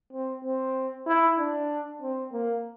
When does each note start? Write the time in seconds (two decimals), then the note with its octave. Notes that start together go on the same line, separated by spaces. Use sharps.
0.13 C4
0.45 C4
1.07 E4
1.39 D4
2.02 C4
2.33 A#3